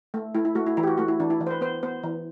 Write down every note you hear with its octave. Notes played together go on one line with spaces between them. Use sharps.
A3
A3 E4
E4
A3 F#4
E4
E3 E4
G4
F#4
A3 F#4
E4
E3 D4
E4
E3
C5
B4
B3 C5
B3 C5
E3